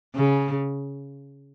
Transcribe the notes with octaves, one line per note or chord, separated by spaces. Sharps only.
C#3